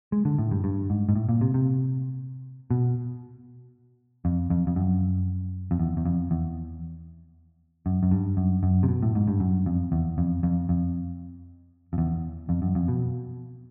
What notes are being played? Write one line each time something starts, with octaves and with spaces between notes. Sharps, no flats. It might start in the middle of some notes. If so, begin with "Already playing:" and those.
G#3
D3
A2
G2
G2
G#2
G#2
A2
A#2
C3
C3
B2
F2
F2
F2
F#2
F2
E2
E2
F2
E2
F#2
F#2
G2
F#2
F#2
C3
B2
A2
G#2
G2
F#2
F2
E2
F2
F2
F2
F2
E2
F2
F#2
F2
B2